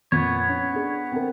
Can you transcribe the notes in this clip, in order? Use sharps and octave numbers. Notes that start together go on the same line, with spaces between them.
F2 A#2 B3 C#5
C#4
D4 G#4
C4 A#4